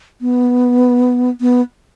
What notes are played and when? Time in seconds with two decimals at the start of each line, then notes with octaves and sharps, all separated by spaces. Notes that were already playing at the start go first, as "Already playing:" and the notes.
0.21 B3
1.41 B3